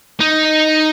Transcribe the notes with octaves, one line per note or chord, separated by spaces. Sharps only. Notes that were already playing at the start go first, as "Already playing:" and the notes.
D#4